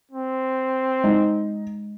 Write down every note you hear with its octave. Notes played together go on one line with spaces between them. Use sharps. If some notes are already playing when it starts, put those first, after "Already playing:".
C4
G#3 D#4